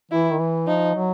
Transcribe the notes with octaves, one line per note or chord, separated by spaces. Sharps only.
E3 E4
D#3
E3
F3 D#4
F#3